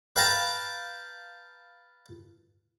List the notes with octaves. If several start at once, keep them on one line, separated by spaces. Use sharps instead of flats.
B4 F5 G5 A5 A#5